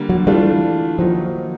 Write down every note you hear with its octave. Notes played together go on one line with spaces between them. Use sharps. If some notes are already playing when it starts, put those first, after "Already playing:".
Already playing: D3 G3 A#3
F#3
E3 G3 A3 D4 F4
D#3 F3 F#3 A#3 D#4